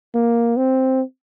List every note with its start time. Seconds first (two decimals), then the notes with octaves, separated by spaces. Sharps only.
0.15 A#3
0.57 C4